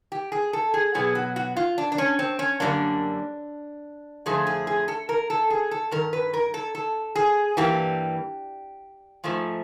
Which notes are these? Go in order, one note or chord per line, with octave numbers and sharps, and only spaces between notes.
G4
G#4
A4
G#4
B2 F#3 B3 G#4
F#4
F#4
F4
D4
D4
C#4
C4
C#4
F#2 D3 G3 A#3 D4
F2 D3 F3 A3 G#4
G#4
G#4
A4
A#4
A4
G#4
A4
G2 D#3 A#4
B4
A#4
A4
A4
G#4
G2 E3 G3 A#3 G4
G#2 F3 A3